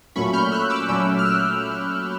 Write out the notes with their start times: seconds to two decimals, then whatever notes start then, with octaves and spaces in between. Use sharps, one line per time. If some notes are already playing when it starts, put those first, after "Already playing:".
0.16 A#2 F#3 A3 C#4 B5 C#6
0.33 F6 G6
0.52 E6 F#6
0.70 D6 E6
0.88 A#2 F#3 A3 C#4 D6 E6
1.19 F6
1.25 E6 F#6